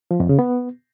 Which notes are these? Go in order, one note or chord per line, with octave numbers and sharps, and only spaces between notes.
F3
F2
C#3
B3